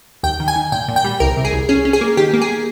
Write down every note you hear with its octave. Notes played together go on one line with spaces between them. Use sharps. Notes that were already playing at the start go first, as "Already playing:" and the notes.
D#2 G5
D#3
G#5
D#3
A#2 G5
A#2
G5
G3
C2 A#4
C3
G#4
C2
C#4 G#4
C#4
G#4
A#3
D#3 G4
A#3
G#4